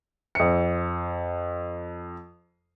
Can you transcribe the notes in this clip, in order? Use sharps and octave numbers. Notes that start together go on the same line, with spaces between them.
F2 C#7